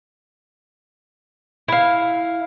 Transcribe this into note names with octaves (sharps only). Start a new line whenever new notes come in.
E4 F5